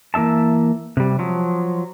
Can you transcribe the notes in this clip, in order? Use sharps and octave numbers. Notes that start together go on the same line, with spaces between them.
E3 A#3 D4 E5 A5
C3 G3
F3 F#3